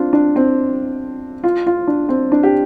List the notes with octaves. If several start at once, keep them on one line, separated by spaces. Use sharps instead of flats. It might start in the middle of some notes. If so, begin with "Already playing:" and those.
Already playing: C4 D4 F4
D4
C4
F4
F4
D4
C4
D4
G4